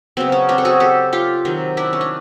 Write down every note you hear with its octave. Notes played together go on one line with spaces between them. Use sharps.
C#3 F#3 B3 C4
C#4
C4 D4
A4
F#4 G#4
G4 A4
F4 G4
C3 D#3 F#3
D4 E4
C#4
D4